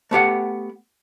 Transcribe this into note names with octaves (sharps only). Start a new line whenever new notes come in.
A3 B3 G4 F#5